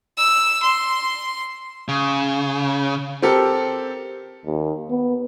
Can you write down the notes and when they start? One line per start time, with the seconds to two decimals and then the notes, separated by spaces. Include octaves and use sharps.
0.17 E6
0.62 C6
1.88 C#3
3.22 C4 G4 A4 A#4
4.46 D#2
4.90 B3